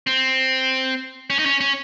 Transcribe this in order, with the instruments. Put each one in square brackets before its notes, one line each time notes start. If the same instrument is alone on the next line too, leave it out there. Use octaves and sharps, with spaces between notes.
[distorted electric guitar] C4
C#4
D#4
C#4
C#4